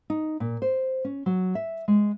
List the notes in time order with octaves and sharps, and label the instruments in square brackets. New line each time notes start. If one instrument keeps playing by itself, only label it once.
[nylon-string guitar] D#4
A#2
C5
C#4
F#3
E5
G#3